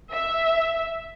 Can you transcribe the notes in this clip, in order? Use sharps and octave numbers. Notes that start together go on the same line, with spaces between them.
E5